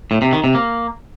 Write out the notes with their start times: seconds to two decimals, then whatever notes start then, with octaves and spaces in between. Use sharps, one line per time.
0.11 A2
0.22 C3
0.33 D#3
0.44 C3
0.55 A#3